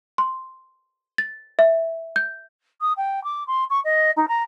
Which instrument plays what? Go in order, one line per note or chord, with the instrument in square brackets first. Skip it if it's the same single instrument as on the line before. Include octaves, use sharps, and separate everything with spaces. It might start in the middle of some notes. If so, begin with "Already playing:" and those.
[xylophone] C6
A6
E5
G6
[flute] D#6
G5
D6
C6
C#6
D#5
D#4
A#5